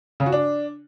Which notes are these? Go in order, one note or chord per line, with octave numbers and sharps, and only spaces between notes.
C#3
F#4
D4